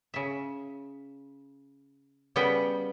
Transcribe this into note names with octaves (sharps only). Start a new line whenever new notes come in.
C#3 E5
C#3 G3 B3 B4 G5